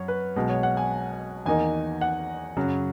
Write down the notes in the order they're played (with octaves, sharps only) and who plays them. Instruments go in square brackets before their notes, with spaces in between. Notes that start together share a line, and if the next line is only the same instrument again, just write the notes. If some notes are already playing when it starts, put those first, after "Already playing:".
Already playing: [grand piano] F#2 C#5
B4
B1 B2 G#3
C#5
F#5
G#5
E2 D#3 A#3 D#4 G#5
F#5
F#2 C#3 F#3